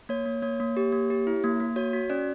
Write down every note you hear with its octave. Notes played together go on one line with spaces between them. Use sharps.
A#3 C#5
A#3
A#3 C#5
A#3
G4
A#3
G4
E4
A#3
A#3
F#4 C#5
F#4
C#4 D5